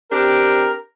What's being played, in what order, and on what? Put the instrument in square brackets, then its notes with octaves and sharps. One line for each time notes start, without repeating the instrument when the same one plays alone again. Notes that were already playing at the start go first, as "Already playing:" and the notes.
[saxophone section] C4 D4 G4 [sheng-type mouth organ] A#4